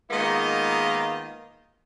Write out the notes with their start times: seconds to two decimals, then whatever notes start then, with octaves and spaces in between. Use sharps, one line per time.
0.11 D#3 G#3 A#3 B3 F4 D#5